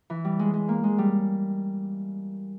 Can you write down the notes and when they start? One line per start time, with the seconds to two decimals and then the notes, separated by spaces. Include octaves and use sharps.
0.10 E3
0.25 G3
0.39 G#3
0.54 G#3
0.68 A#3
0.84 G#3
0.98 G3